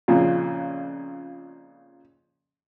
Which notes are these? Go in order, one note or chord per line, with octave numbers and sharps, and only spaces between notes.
F2 A#2 C#3